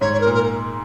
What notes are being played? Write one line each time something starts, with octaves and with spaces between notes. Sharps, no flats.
G#2 C#5
C#5
A#4
A#2
A#4